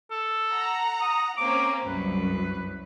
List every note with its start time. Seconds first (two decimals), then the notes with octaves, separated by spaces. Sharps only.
0.11 A4
0.52 F#5 A#5
1.01 D#6
1.38 A#3 C4 C#4 D6
1.86 C2 F#2 B4